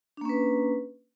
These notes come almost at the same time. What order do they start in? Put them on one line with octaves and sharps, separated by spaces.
D4 A#3 C#4 B4